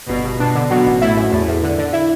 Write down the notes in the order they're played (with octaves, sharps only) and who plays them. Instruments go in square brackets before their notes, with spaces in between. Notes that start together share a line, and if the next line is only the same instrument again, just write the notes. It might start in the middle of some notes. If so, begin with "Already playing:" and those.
[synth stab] G1 [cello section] B2
[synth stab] G1
[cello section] B2 [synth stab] D4
[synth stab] D3
[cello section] B2 [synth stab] F#3
[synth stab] A1
[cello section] A2 [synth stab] E4
[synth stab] F#2
[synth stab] E2 [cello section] A2
[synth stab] E2
D3
D3
E4